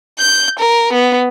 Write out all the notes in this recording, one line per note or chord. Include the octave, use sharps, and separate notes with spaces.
G6
A#4
B3